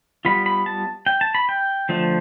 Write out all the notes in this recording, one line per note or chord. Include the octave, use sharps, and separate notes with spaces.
G3 B3 F4 B5
B5
A5
G5
A5
B5
G5
D3 F3 A3